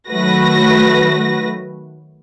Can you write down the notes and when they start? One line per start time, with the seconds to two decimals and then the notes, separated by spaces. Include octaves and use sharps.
0.11 D#3 F#3 A3 F#4 B4 A#6